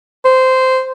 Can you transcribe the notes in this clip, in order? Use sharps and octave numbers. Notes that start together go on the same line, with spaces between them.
C5